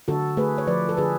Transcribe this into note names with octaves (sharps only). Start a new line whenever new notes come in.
D3 F#4 A4
A3 G#4 B4
C#5
F3 B4 D5
A4
D3 G#4 B4